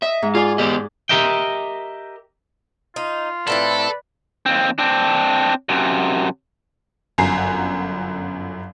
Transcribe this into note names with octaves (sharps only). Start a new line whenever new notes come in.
D#5 E5
G#2
F4 G#4 D5 G#5
B3 G4 D#5
G4 A#4 D#5 E5 G5
D#4 F4
A2 C4 E4 A4 B4 D5
D#2 C4
C4 D4
F#2 C3
G1 F#2 G#5 A#5 C7